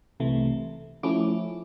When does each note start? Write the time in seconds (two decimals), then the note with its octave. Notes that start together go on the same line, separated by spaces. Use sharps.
0.20 C2 C3 E3 A3
1.03 F3 A3 C#4 E4 D6